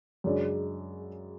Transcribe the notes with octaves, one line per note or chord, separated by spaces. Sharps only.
F#2 C#3 G#3 D4